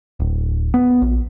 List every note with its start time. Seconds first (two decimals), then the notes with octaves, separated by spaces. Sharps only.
0.20 D1
0.74 B3
1.02 A#1